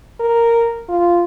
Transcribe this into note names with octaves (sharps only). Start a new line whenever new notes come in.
A#4
F4